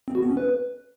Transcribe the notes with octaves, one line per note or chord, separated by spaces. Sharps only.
C4
F#4
B3
C#4
B4